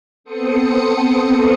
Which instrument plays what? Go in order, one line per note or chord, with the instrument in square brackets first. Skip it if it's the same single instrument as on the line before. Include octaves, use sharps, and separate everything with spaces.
[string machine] B3 C4 A4 C5 D#6 C#7